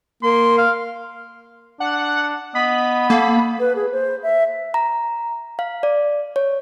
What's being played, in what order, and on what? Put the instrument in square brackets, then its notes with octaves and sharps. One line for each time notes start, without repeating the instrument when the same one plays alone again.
[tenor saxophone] A#3 [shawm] C6
[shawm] F5
[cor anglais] D4 [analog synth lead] F#5
[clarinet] B3 [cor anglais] D#5 [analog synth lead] B5
[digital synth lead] A#3 [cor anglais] A4
[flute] B4
G#4
C5
E5
[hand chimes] A#5
F5
D5
C#5